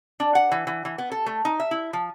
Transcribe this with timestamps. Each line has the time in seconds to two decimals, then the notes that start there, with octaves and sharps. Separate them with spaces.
0.20 D4
0.35 F#5
0.52 E3
0.67 E3
0.85 E3
0.98 B3
1.12 A4
1.26 A3
1.45 D#4
1.60 E5
1.71 E4
1.93 F3